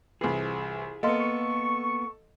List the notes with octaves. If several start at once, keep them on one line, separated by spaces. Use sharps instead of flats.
C2 E3 F4 G#4
A#3 B3 A4 D#5 F5 C6
C#6